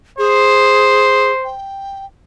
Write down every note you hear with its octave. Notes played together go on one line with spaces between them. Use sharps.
G#4 C5
G5